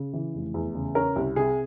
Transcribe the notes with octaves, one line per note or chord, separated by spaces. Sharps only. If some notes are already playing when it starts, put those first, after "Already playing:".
Already playing: C#3
E3
F1
E2
C#3
C#4 A#4
C2
C3 G#4